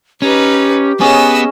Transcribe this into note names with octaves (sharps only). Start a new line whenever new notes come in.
C#4 D#4 G4 B4
B3 C#4 G#4 D#5 E6